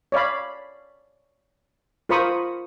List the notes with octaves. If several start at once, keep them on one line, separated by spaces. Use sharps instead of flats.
C#5 D5 F5 B5
F4 A#4 C5 B5 C#6 D#6